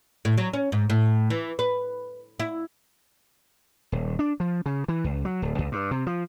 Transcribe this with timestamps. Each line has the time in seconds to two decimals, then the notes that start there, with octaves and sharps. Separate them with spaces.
0.25 A2
0.37 F#3
0.54 C#4
0.72 G#2
0.90 A2
1.30 E3
1.59 B4
2.40 E4
3.92 D#1
4.19 D4
4.40 F3
4.66 C#3
4.88 E3
5.04 C#2
5.25 F#3
5.42 D1
5.58 C#2
5.72 G2
5.91 C3
6.06 F3